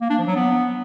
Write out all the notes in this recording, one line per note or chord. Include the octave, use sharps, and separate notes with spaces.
A#3
D4
F3
F#3
B3